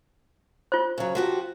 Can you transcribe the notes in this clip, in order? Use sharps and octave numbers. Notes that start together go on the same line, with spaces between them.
F4 C5
C#3 F#3
F3 F#4 G4